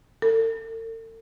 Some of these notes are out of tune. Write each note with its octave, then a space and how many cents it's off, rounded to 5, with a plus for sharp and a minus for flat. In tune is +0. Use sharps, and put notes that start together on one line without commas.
A4 +45